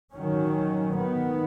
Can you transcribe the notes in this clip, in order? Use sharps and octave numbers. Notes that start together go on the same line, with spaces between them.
D#3 F#3 C#4
D#3 B3